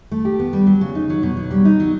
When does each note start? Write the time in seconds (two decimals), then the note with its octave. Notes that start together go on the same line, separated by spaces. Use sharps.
0.11 A3
0.25 G4
0.40 B3
0.53 G3
0.67 F#3
0.81 C#3
0.95 D#4
1.10 F#3
1.23 B2
1.37 F#3
1.51 G3
1.65 D#4
1.80 F#3